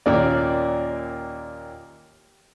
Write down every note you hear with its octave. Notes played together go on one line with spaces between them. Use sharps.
D#2 A#2 A#3 C#4 D5